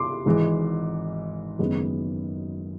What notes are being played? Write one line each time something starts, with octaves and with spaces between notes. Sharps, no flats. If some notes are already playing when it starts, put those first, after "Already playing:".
Already playing: C6 D6
G#1 G#2 E3 G#3
F#1 F#2 D#3 G#3 B3